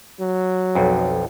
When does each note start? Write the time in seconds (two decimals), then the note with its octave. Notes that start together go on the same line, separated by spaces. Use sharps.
0.21 F#3
0.75 B1 F2